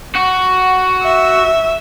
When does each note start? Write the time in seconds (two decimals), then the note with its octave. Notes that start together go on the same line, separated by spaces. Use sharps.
0.15 F#4
1.02 E5